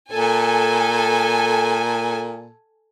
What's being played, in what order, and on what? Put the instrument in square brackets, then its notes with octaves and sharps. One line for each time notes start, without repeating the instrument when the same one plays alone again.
[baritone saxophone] A#2 [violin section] A4 G#5